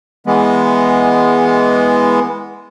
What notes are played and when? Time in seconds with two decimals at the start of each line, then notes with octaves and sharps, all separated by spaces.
0.27 E3 G#3 B3